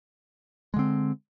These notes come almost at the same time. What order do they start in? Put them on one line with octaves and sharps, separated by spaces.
G#3 D3 C4